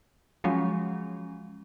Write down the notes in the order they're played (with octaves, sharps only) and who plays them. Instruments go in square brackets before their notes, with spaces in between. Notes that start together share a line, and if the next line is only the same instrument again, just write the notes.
[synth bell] F3 F#3 G#3 C#4